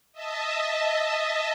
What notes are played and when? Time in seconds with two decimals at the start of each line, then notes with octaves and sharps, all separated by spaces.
0.13 D#5 E5 A5